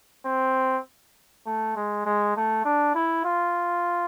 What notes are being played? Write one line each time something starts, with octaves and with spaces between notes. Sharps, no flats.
C4
A3
G#3
G#3
A3
D4
E4
F4